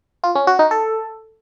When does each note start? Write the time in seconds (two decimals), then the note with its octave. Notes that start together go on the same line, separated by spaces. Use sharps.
0.24 F4
0.35 C#4
0.47 F#4
0.59 D#4
0.71 A4